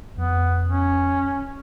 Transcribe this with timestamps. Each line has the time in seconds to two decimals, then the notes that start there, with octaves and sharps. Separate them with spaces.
0.17 F2 B3
0.67 C#4